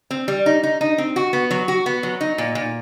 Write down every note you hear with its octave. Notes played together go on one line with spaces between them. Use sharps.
C4
G3
D#4
D#4
D#4
C4
F#4
B3
F#3
F#4
B3
F#3
D#4
A#2
A#2